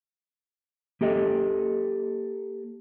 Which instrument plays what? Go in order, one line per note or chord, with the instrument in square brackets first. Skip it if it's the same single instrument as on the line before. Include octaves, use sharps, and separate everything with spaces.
[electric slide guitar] A#3 G4 A4 D#5